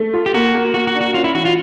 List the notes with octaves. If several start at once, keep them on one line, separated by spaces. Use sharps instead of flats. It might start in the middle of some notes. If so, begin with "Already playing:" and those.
Already playing: A3
F4
G4
A#3 F#4
A#3
A#3 F#4
F#4
D4
F#4
C#4 F4
E4
E3 F#4
F4